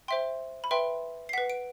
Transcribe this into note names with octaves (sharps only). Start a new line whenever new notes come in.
C5 E5 G5 C6
B5
B4 E5 G5 C6
C7
B4 F#5 B6
D7